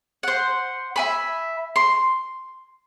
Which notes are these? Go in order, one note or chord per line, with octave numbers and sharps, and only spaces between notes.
C5 F#5
E5 G#5 B5
C6